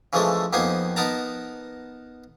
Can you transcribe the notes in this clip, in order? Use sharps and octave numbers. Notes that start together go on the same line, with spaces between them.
C#3 E3 F3 G#3 A3 A4
F2 A#3 B3 D#4 C5 G#5
B3 D#4 A#4 A5 A#5